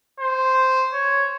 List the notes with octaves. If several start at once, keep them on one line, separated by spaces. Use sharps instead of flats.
C5
C#5